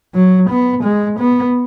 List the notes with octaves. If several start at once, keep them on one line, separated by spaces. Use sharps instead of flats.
F#3
B3
G#3
B3